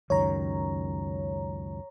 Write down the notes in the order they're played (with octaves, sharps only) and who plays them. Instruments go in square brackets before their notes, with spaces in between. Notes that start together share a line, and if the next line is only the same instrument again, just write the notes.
[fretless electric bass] C#2 F#2 D#3 [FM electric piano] C#5 A#5